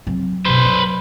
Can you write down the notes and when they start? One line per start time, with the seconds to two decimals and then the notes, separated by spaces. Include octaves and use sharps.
0.07 F#3 C4
0.45 F#2 B2 B4 C5
0.65 F#3